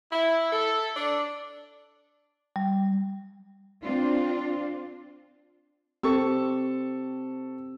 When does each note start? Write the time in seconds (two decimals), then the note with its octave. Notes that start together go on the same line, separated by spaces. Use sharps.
0.12 E4
0.51 A4
0.96 D4
2.56 G3
3.82 C4 D4 F4
6.03 C4 G4 A4 C#6 E6